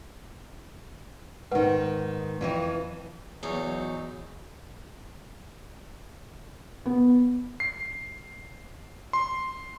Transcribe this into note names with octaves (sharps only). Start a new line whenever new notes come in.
G#2 D#3 B4 F#5
F2 E3 D#5
E2 F#3 D#4 C#5
B3
C7
C6